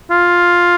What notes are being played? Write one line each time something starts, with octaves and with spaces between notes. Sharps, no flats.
F4